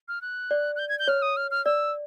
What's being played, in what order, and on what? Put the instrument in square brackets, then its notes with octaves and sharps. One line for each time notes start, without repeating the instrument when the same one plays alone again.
[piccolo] F6
F#6
[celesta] D5
[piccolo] F#6
G6
G#6
G6
[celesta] C#5 [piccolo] F6
[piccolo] D#6
F6
F6
[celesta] D5 [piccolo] E6